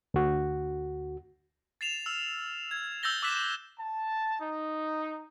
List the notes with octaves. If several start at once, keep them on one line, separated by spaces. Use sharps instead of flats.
D2 F#4
A6 C7 E7 F7
E6 F6
G#6
E6 G6 A6 A#6 G7
D6 E6 F#6 A6 B6 E7
A5
D#4